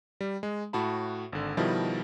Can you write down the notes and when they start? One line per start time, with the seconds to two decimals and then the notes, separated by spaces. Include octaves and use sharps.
0.21 G3
0.43 G#3
0.73 A2 F#4 A5 B5
1.33 G#1 D3
1.57 B2 D#3 F3 G3 E4